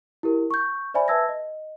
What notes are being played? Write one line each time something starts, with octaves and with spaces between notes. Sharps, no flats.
E4 G4 A#4
C#6 G6
C5 D5 E5 G#5 B5
B4 E5 A5 E6 G#6 A#6
D#5